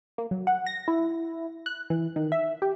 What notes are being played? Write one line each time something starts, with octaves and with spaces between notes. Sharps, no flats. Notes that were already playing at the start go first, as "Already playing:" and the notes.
A#3
F#3
F#5
A#6
E4
F#6
E3
D#3
E5
G4